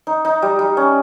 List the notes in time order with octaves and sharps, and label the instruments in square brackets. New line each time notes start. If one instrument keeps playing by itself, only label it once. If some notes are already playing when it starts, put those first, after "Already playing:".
[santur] D#4
D#4
G3
G3
C#4